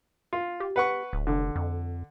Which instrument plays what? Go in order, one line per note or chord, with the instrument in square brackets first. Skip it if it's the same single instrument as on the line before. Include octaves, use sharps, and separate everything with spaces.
[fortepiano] F4
[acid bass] G4
[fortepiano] B4 F#5 C#6
[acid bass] D1
[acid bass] F1 [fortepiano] D3
[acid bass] F2